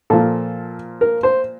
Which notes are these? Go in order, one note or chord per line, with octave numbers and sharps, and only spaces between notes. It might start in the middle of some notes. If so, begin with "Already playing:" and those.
A#2 F3 A4
A#4
C5